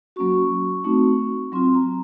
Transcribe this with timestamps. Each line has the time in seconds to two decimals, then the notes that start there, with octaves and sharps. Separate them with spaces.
0.16 F#3 A#3 C#4 F#4 C#6
0.84 A3 C4 D#4 F#4
1.52 F#3 C4 F4 C6
1.75 A#5